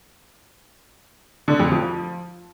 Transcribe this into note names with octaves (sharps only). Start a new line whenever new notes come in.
D3
F2
F3